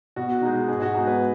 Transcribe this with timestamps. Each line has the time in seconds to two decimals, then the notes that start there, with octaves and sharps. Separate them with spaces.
0.16 B2 F#4
0.42 G#3 D#4
0.68 G#2 G#4
0.82 F#4
0.94 G#3 B3 D#4 G#4
1.07 B4